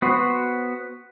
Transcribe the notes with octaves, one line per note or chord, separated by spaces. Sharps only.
B3 F#4 C5